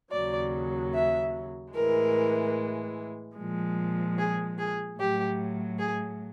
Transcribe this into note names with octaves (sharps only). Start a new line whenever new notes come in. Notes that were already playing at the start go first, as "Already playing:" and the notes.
D#2 C#3 F#3 D5
E5
A2 E3 G#3 A#4
A#2 F3 G#3
G#4
G#4
A2 F#3 G4
G#4